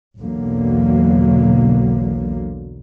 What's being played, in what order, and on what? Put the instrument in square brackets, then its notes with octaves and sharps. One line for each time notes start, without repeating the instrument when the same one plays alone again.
[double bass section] B1 E2 B2 D3 F#3 A#3